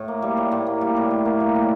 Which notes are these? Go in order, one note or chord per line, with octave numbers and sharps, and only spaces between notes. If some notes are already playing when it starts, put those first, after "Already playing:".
Already playing: A2
A#3
G3
A2
A2
A#3
G3
A2
A2
A#3
G3
A2